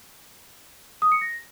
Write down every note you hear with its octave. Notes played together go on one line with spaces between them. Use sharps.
D#6
C#7
A#6